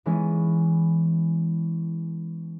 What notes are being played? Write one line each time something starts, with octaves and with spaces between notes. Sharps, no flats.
E3 G#3 B3 C#4